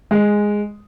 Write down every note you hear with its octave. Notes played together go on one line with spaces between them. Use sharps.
G#3